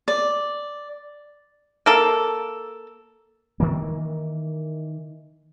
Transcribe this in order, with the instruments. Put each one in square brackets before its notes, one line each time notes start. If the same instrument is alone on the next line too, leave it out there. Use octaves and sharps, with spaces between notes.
[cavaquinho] D5
[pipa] A#3 A4
[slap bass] D#3 E3 A#3